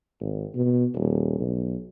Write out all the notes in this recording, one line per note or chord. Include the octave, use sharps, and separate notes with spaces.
G#1
B2
D#1
B1